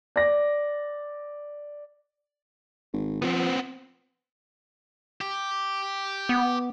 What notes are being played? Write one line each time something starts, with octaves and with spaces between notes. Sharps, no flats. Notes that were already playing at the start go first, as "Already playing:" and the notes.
D5 A#6
G#1
F3 B3 C4
G4
B3